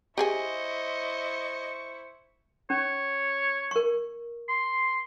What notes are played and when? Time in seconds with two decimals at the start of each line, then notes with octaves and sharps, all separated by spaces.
0.18 E4 G4 G#4 C5 D#5 G#5 C#6
2.70 C#4 C#5
3.71 A#4 C#6
4.49 C6